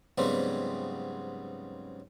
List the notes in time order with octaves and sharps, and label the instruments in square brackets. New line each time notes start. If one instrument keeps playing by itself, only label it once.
[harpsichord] G#2 C#3 F#3 G3 B3 C4